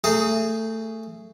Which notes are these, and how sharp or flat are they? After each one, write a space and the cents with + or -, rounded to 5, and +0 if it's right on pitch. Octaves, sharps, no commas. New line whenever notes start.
A3 +15 G#4 +0 A#5 -45